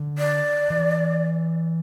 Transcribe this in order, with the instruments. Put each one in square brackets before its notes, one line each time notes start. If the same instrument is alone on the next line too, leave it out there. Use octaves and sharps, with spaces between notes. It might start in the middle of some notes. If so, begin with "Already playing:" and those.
Already playing: [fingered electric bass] D3
[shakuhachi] D5
[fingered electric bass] E3